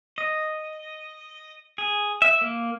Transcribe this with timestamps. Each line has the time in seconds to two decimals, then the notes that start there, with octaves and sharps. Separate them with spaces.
0.18 D#5
1.78 G#4
2.22 E5
2.41 A#3